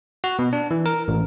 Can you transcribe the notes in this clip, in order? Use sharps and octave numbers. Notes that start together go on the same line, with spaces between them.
F#4
B2
D4
E3
A#4
A1